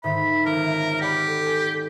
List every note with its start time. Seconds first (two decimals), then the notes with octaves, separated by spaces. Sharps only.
0.04 G#2 D3 D#3 E5 B5
0.46 G#1 C#2 A#4
1.01 G4 D5 F#5 B5
1.28 A4
1.46 G#5